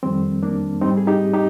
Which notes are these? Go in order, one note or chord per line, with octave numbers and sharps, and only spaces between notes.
F2 D#3 G3 C4
A#3 D4
G#2 G3 C4 D#4
G#4
D#4 G4
D#4 G4